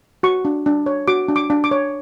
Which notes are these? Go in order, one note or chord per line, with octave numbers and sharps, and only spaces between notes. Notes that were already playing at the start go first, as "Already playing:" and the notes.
F#4 C#6
D4
D4
C#5
F#4 D6
D4
D6
D4
D6
C#5